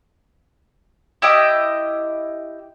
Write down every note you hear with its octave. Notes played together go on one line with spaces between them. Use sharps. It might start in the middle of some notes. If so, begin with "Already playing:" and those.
E4 G4 D#5 G5